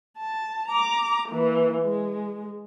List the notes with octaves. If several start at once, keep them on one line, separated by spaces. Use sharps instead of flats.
A5
A#5 D6
E3 A#3
G#3